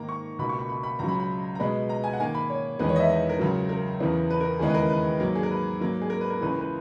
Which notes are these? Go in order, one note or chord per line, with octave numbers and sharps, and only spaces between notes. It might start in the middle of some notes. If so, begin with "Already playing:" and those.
Already playing: G#2 D#3 A#3 A#5
C#6
C#2 B2 A#3 B5
C#6
B5
B5
B5
C#2 C#3 F#3 A#5
B5
B5
A#5
B2 G#3 B3 B5
A#5
G#5
F#5
G#2 D#3 A#3 G#5
B5
C#5
E2 D#3 G#3 B3 B4
C#5
D#5
E5
D#5
A#4
C#2 C#3 F#3
A#4
E2 C#3 E3 B3
B4
A#4
D#2 C#3 E3 G#3 B3 G#4
B4
A#4
B4
G#2 F#3 A#3
G#4
A#4
B4
G#2 F#3 A#3
G#4
A#4
B4
A#4
C#2 C#3 E3 B4
A#4
B4